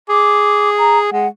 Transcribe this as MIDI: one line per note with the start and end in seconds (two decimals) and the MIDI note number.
0.09 1.12 68
0.09 0.70 86
0.78 0.99 82
1.12 1.27 56
1.12 1.27 78